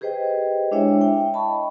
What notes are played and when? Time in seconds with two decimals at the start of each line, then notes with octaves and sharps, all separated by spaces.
0.01 G4 G#4 B4 C5 D#5 G5
0.71 G#3 D4 E4 C#5 E5 G5
1.01 G5
1.33 D#5 A5 B5 C#6